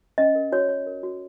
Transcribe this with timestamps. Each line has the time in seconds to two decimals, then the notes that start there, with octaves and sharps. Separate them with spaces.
0.18 C#4 D#5
0.35 A#4
0.52 F#4 C#5
0.69 C#5
0.87 A#4
1.03 F#4